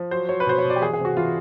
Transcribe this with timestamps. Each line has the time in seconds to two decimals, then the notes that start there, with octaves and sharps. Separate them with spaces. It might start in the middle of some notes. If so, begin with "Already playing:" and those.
Already playing: F3
0.11 F#3 C5
0.29 F#3 C#5
0.40 B4
0.46 B2 C5
0.58 C#5
0.64 B2
0.70 D5
0.76 G4
0.82 E3 G#4
0.93 G#4
0.99 C3
1.05 F#4
1.17 E3 F4